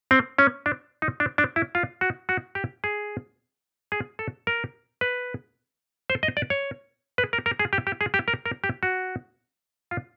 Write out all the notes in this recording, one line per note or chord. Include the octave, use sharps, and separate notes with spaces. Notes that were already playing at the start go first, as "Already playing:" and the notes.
C4
C#4
D4
D#4
D4
D4
E4
F4
F#4
F#4
G4
G#4
G#4
A4
A#4
B4
C5
D#5
D5
C#5
B4
A#4
A#4
G#4
G4
G4
G#4
G4
A#4
A#4
G4
F#4
F4